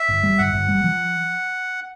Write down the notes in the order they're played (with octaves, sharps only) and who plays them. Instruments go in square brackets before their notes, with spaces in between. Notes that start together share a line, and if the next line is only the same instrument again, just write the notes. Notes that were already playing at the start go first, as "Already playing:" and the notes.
Already playing: [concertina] E5
[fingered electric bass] G1
G3
[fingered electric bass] G1 [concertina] F#5
[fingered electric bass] G1
G3
F3